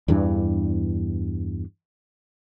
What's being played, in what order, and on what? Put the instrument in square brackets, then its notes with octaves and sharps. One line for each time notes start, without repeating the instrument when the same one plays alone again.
[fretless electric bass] E2 G2 E3 D4